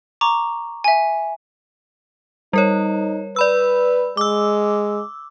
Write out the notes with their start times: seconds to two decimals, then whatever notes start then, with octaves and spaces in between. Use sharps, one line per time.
0.21 A#5 C#6 D6
0.84 E5 G#5
2.53 G3 D#4 A#4 C#5
3.36 B4 D5 B5 E6
4.17 G#3 D6 E6